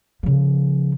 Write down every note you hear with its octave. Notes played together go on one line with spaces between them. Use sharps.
C#3 F3